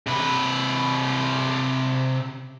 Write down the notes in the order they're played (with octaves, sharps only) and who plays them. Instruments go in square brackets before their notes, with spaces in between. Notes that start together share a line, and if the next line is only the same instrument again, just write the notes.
[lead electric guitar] C3 B4